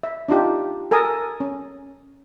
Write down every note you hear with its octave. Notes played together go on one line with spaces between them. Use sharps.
E5
D4 D#4 F4 G4
A4 A#4 G#5 A5 D#6
C#4